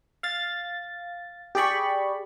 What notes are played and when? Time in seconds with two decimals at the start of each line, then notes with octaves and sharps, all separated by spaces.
0.23 F5 A6
1.55 G4 G#4 D5 B5 C#6